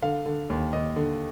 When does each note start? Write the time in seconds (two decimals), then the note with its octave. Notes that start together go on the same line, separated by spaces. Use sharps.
0.02 D3 F5
0.26 D3
0.50 D#2
0.73 D#2 D#5
0.96 D3